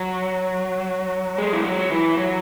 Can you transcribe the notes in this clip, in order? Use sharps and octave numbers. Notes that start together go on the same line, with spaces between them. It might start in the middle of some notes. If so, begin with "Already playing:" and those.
Already playing: F#3
G#3
E3
F#3
F#3
E3
F#3